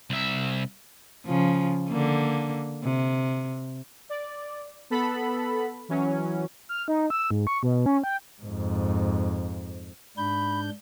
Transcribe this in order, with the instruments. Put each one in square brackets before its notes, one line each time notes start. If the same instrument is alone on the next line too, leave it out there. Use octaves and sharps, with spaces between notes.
[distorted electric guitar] C2 E5
[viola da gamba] C#3 F3
D3 A#3
C3
[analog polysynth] D5
B3 A4 B5
E3 F#3 C#4
[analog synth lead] F6
D#4
E6
G#2
C#6
B2
C#4
G5
[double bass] F2 G#2
[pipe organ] G#2 D4 G6 [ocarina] B5